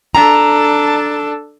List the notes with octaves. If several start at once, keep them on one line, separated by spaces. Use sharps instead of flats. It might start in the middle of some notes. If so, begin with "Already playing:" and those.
D4 A4 A#5